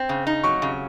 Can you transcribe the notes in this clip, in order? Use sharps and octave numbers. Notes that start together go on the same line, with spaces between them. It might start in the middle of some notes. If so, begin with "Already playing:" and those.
Already playing: C4
C#3
D#4
F#3 C#6
C#3